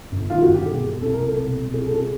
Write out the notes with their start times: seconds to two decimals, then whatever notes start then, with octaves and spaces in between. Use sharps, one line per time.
0.11 G1
0.30 D#3 F4
0.42 F#4
0.47 G1
0.54 G4
0.66 B2 G#4
0.84 B2
1.01 C2 A4
1.14 A#4
1.20 C2
1.26 A4
1.37 B2
1.56 B2
1.74 C2 G#4
1.86 A4
1.92 C2
1.97 G#4